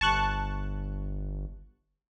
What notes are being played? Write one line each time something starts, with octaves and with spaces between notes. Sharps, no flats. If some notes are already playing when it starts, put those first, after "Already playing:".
G1 A5 C#6 F#6